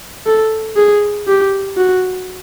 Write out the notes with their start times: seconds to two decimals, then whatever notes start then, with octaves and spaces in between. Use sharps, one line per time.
0.26 A4
0.76 G#4
1.28 G4
1.77 F#4